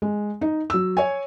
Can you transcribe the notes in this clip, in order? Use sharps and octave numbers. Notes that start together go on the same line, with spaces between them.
G#3
D#4
F#3 E6
C#5 G#5